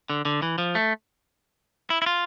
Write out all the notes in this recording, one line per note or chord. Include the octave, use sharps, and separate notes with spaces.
D3
D3
E3
F3
A3
E4
E4
F4